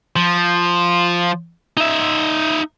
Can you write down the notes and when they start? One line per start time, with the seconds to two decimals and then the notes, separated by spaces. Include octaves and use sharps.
0.16 F3
1.77 D#4 E5